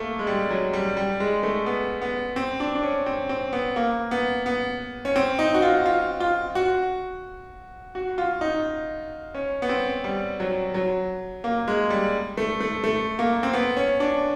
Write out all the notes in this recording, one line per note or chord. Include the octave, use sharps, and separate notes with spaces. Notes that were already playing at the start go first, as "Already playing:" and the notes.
Already playing: A3 A#3
G#3
G3
F#3
G3
G3
G#3
A3
B3
B3
C4
D4
D4
C#4
C4
C4
B3
A#3
B3
B3
C#4
C4
D#4
F#4
F4
F4
F4
F#4
F#4
F4
D#4
C#4
B3
C4
G3
F#3
F#3
A#3
G#3
G3
A3
A3
A3
A#3
C4
B3
C#4
D4